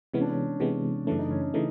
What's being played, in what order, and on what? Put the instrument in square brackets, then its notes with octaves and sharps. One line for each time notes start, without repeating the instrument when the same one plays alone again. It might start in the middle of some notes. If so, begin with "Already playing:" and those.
[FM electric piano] C3 E3 G#3 B3 [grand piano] C#4
[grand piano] D4
C#4
[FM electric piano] C3 E3 G#3 B3
[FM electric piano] F#2 C#3 E3 A3 [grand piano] D4
[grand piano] D#4
C#4
C#4
[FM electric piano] C#3 E3 A3 [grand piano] D#4